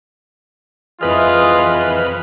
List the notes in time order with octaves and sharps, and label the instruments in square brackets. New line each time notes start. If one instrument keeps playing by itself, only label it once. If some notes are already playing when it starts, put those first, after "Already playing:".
[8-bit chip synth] F2 B4 F6 [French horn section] E3 [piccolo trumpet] F4 [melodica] G#4 D#5